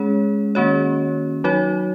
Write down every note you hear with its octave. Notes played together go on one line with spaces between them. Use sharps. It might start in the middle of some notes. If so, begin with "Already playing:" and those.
Already playing: G#3 C#4 G#4 C#5
D#3 A#3 C#4 F#4 C#5
F#3 D#4 F#4 C#5